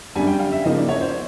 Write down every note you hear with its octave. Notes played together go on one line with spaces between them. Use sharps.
F#2 D3 G3 G#5
G5
F5
E5
C#3 F3 A#3 D#4 D#5
D5
C#5
C5